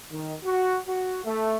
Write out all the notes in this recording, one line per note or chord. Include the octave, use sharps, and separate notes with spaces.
D#3
F#4
F#4
A3